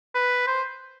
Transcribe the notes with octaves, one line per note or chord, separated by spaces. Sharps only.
B4
C5